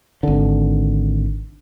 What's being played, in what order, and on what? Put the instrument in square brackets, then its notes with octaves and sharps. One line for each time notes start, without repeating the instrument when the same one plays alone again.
[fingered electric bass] G#1 D3